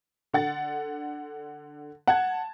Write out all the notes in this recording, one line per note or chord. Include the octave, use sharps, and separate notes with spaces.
D3 F#5 A6
F#5 A5 G#6